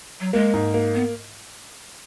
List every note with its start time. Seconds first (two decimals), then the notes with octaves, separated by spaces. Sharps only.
0.20 F#3
0.33 G#3 A#3
0.53 G#2
0.74 A#3
0.94 B3